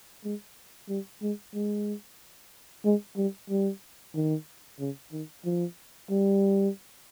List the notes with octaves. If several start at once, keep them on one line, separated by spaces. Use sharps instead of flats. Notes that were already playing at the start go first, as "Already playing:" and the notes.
G#3
G3
G#3
G#3
G#3
G3
G3
D#3
C#3
D#3
F3
G3